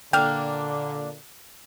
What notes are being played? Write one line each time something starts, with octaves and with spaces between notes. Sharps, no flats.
A#2 D3 A#3 D4 G5 F6